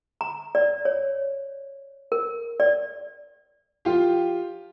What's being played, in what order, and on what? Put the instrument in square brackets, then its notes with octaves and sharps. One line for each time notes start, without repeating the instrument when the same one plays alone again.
[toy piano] A#5
D5
C#5
A#4
D5
[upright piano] F3 F4 G4